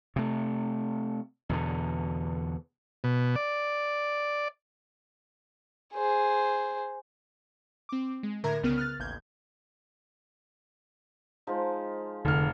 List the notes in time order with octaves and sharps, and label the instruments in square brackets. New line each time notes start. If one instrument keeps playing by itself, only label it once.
[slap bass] C3 A3
E2 B2 D3
[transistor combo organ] B2
D5
[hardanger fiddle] G#4 C5
[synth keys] C4 D6
G#3
A2 D3 A#4 E5 A#5 G#6
C2 C#3 B3 A#4 F6 D#7
F6 F#6 A6
A1 D#2 G6 G#6
[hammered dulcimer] F3 G#3 D#4
[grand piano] F1 F6 [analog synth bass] D3